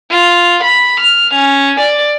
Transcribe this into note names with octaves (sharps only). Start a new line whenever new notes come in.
F4
B5
F6
C#4
D5